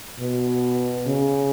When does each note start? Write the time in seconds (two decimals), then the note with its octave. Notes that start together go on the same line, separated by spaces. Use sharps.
0.20 B2
1.07 C#3